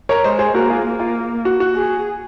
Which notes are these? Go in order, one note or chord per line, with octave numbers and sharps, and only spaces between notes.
A#4 C#5
G#3 C5 D#5
G#4 C5
A#3 F#4 A#4
F4 G#4
A#3
F4
F#4
F#4
G#4